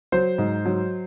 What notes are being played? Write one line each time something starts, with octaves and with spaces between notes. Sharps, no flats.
F#3 C5
G#2
F#3